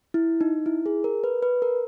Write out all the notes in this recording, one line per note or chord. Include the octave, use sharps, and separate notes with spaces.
E4
D#4
E4
G#4
A#4
B4
B4
A#4